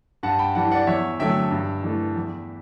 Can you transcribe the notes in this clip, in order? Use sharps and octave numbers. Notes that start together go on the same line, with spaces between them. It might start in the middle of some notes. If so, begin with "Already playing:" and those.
G2 F#5 A5
G5 B5
E3 G3 F#5 A5
D5 F#5
E2 C#5 E5
D3 F#3 A3 E5 G5
G2
E3 A3
E2